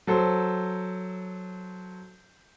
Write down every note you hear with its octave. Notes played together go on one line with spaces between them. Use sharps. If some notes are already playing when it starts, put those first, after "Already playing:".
F#3 A4 C5